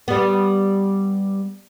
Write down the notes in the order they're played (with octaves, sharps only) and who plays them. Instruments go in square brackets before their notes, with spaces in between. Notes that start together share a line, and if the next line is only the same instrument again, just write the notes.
[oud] G3 B3